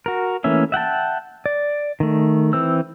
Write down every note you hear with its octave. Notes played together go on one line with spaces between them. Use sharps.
F#4 A#4
E3 A3 A#3 C#4 E5
E5 F#5 G5 A5
D5
D#3 A3
E3 C4 E6